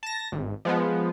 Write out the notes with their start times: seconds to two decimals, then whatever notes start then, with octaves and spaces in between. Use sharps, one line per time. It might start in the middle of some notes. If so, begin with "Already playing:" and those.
0.03 A5 A#6
0.32 G#1
0.65 F3 G#3 B3